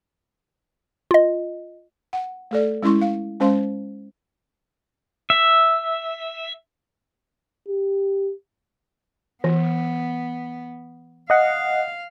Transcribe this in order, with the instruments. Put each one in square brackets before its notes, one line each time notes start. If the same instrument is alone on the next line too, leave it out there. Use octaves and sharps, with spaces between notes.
[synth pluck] F4 D#5
[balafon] F#5
A3 A4 D5
G#3 C#4 E4 C6 C#6
F5
G#3 C#4 C5 F5 C6
[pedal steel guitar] E5
[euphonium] G4
[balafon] E3 [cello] B3
[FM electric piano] D#5 F#5 [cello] F5